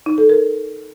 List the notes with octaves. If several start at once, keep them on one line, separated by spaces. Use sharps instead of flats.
D#4
A4
A#4